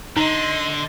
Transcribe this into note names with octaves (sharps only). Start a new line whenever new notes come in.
D3 D#4 D#5 A#5 C6